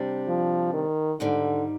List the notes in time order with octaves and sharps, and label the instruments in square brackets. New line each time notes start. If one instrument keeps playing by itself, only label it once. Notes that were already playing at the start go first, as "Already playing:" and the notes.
Already playing: [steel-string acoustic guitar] C3 G3 D4
[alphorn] F3
D#3
[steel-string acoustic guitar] G#2 D#3 G3 [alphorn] D3